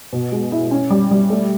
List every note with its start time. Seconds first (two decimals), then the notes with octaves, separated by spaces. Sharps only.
0.13 B2
0.32 G#3
0.52 E4
0.71 C#4
0.90 G3
1.11 G3
1.30 A3